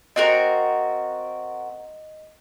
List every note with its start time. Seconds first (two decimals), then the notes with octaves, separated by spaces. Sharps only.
0.16 C4 F#4 A#4 D#5